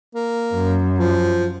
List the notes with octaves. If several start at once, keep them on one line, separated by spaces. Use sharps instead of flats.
A#3
F#2
F3